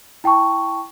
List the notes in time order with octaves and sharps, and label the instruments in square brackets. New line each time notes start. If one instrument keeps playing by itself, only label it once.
[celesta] E4 G5 A5 C#6